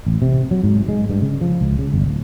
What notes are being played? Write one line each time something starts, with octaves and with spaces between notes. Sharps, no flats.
A1
C3
F#3
G#2
G#3
G2
C#3
F3
C#2
C#3
G1
D1